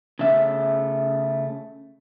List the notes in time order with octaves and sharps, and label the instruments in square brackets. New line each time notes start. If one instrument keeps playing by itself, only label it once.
[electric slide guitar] C#3 A3 E5